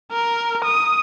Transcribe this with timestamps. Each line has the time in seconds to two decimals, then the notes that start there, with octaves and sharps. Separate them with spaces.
0.12 A#4
0.64 D#6